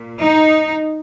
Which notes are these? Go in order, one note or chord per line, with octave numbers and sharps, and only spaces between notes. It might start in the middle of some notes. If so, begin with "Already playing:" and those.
Already playing: A#2
D#4